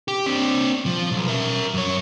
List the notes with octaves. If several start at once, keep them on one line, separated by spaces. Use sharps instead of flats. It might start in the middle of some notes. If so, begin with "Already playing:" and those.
G4
C4 D4
F3
B1
A#4 E5
F#2 C#5